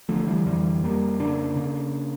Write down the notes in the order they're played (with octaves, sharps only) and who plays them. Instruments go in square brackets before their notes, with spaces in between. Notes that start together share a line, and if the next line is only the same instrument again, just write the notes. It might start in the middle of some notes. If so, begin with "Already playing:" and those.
[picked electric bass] D3 F3 A3
E3 G3
F2 E3 G3
F2 G3 A#3
C#3 A#3 D4
C#3